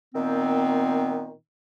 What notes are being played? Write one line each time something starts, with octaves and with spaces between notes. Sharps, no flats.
A#2 D#3 B3 C4